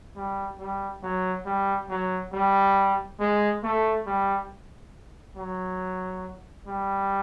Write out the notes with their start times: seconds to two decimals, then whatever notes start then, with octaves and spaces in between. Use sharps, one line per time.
0.16 G3
0.59 G3
1.03 F#3
1.46 G3
1.89 F#3
2.33 G3
3.20 G#3
3.64 A3
4.06 G3
5.37 F#3
6.67 G3